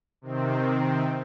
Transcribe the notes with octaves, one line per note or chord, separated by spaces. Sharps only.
C3 D#3 C4